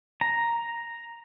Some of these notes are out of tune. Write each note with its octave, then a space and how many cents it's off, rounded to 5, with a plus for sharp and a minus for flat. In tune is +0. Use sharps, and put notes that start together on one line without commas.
A#5 +0